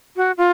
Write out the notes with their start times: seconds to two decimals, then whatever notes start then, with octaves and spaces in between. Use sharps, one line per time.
0.16 F#4
0.37 F4